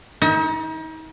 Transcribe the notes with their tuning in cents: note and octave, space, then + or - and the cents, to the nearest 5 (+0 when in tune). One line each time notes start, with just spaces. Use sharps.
D#4 +35 E5 -25